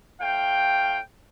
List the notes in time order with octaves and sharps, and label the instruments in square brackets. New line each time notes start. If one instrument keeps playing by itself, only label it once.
[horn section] A2 F5 G5